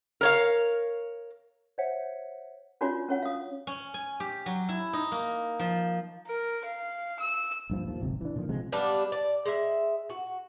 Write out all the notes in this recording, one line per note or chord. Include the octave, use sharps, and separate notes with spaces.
A#4 C#5 F5
C5 C#5 E5 F#5
C#4 D4 F4 F#4 C#5 D5
C#4 C#5 F#5
F5 D#6
C#4
G#5
G4
F#3
E4
D#4
A#3
F3
A#4
F5
E6
A#1 G2 F3
D#2 F3
D1 G#1 C3
E3 D4
A#2 D3 D#3 F3
C3 F3 G#3 C4
G3 B3 D4 F5
D5
G#3 E5
F#4